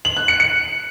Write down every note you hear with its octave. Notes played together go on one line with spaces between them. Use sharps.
F#7
F#6
C#7
C#7